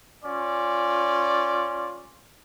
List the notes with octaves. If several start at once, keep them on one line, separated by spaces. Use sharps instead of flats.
C#4 F4 D5